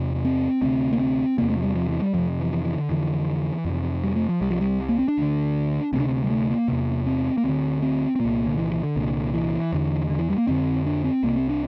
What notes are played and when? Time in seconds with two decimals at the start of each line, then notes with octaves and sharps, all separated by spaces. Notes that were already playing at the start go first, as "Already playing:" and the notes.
Already playing: E2 C3
0.25 C4
0.62 D2 C3 C4
0.93 A#3
0.99 C4
1.38 E2 C3 A#3
1.50 A3
1.57 F3
1.63 G3
1.75 F3
1.89 E3
2.02 G3
2.14 F2 C3 F3
2.40 E3
2.52 E3
2.64 E3
2.77 D3
2.89 F2 D3 E3
3.65 F2 C3
4.03 G3
4.16 A3
4.29 F3
4.41 C2 C3 G3
4.51 F3
4.61 G3
4.89 A#3
4.99 C4
5.08 D4
5.18 D2 D3
5.93 D2 C4
5.96 C3 D4
6.07 C4
6.24 G3
6.30 A3
6.50 A#3
6.68 E2 C3
7.06 C4
7.38 A#3
7.44 D2 D3 C4
7.82 C4
8.15 C4
8.20 C2 A#2 A#3
8.46 D3
8.58 E3
8.72 E3
8.83 D3
8.96 C2 A#2
9.34 E3
9.73 E2 D3
10.10 D3
10.19 E3
10.30 G3
10.38 A#3
10.47 F2 D3 C4
10.86 D4
11.04 C4
11.23 C2 C3 A#3
11.36 C4
11.49 D4